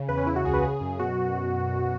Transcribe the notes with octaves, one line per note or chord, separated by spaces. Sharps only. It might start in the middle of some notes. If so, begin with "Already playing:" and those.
Already playing: C#3
E2 B4
C#4
C#3 E4
F#4
C#2 G#4
B4
C#3 G#4
F#2
B2 F#4